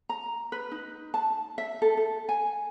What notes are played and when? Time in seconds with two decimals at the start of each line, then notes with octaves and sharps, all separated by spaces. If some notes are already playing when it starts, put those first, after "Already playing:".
0.09 A#5
0.52 B4
0.72 D#4
1.14 A5
1.58 E5
1.82 A4
1.97 A4
2.29 G#5